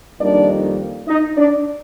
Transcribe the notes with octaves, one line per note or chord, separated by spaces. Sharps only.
F2 D#3 G3 A#3 D4 D#4 D5
D#4 D#5
D4 D5